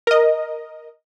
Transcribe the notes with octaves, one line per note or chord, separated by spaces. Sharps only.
A#4 D#5